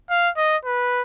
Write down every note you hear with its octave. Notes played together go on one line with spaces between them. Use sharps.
F5
D#5
B4